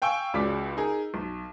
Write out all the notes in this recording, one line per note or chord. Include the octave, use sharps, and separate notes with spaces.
F5 G5 G#5 C#6 E6 G7
C#2 C#3 F#4 D5 D6 B6
D#4 G#4 A#4
B1